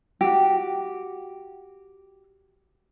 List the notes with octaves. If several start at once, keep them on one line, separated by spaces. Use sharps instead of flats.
F#4 G4